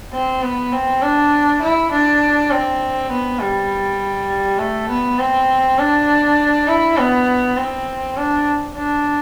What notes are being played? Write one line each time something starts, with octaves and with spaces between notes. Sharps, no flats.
C4
B3
C4
D4
E4
D4
C4
B3
G3
A3
B3
C4
D4
E4
B3
C4
D4
D4